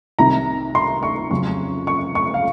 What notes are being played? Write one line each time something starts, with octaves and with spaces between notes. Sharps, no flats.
C2 C3 D#3 A#5
C6
C#6
F2 C#3 F#3 C#4 C#6
C#6
C#6
F5